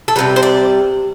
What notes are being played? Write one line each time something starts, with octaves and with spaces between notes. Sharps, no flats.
A4
C3 E3 G3 B4
C5
D5